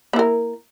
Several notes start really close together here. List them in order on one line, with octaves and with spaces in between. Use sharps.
A#3 E4 A#4